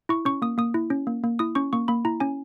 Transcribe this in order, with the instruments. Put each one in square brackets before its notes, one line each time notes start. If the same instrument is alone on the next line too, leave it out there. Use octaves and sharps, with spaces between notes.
[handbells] E4 C#6
C#4 C#6
A#3 D#6
A#3 D#6
E4
C#4
A#3
A#3
E4 D#6
C#4 C#6
A#3 C#6
A#3 B5
E4 A#5
C#4 G#5